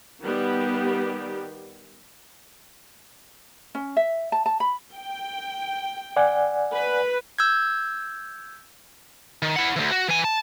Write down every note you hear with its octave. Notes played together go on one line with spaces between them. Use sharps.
D#3 G3 B3 G4
C#4
E5
A5
A5
B5
G5
D5 F#5 G#5
B4
E6 G6 G#6
D#3
E4 F#5
D2 E3
F#4
E3 G#5
A5